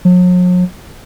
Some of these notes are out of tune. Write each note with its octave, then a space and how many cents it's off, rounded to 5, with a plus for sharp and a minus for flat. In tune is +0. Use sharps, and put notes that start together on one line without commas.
F#3 -45